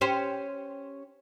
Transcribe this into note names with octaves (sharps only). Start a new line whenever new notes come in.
C#4 G4 C5